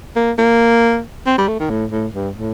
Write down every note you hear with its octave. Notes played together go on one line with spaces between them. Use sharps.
A#3
A#3
C4
G3
A3
D#3
A2
A2
G2
A2